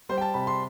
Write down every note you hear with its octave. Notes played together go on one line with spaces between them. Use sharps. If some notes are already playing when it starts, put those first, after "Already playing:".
G3 C5
G5
A5
C3 B5
C6